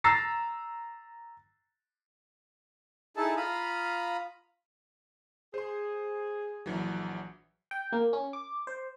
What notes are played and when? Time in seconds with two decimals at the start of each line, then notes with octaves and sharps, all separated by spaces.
0.04 A#5 E6 A6 A#6 C7
3.17 D#4 E4 G#4 A4 A5
3.37 F4 F5 A#5 B5 D#6
5.54 G#4 C5 C6
6.66 A#1 E3 F#3
7.71 G5
7.92 A#3
8.13 C#4
8.33 D6
8.67 C5